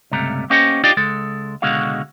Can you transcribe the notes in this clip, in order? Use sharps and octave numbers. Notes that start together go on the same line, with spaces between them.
C#2 G2 C3 A3 A#5
A#3 B3 C#4 G4 C5 D#5
D4 D#4 F4 G4 D5 D#5
C#2 G#3 A4
C#2 B2 D3 G#3 F#4 F5